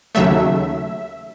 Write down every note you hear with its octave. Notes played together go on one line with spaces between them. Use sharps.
D#2 C#3 F#3 A3 E5